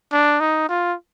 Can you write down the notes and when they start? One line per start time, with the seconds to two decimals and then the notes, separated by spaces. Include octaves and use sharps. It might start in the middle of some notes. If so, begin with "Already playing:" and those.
0.12 D4
0.40 D#4
0.69 F4